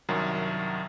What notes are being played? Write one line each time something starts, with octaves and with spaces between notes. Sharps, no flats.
C2 F#2 D#3 F#3